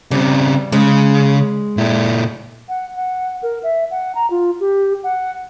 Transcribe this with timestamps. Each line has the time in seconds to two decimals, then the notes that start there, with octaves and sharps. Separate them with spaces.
0.11 C#3 G3 C4
0.72 C#3 G#3
1.77 A#2 E4
2.69 F#5
2.96 F#5
3.43 A#4
3.63 E5
3.91 F#5
4.15 A#5
4.30 F4
4.60 G4
5.03 F#5